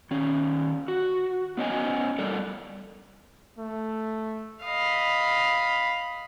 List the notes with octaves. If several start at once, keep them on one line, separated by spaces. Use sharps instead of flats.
D#3 C#4
F#4
B3 C#4 D#5 G#5
G3 A4 A#4 D5
A3
D#5 F5 B5